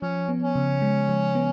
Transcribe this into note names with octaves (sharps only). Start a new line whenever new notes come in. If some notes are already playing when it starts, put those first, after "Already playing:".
F3 C#4
B3
C#4
C#3
G#3
F3
B3